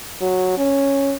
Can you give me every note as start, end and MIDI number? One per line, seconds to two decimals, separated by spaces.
0.21 0.57 54
0.57 1.14 61